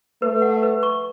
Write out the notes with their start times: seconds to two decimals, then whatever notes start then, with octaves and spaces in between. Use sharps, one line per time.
0.22 A3 B4
0.42 F#5
0.63 B4
0.83 C#6